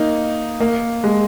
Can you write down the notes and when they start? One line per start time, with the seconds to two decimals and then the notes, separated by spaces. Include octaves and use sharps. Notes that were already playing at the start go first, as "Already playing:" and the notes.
Already playing: A#3 D#4
0.61 A#3
1.04 G#3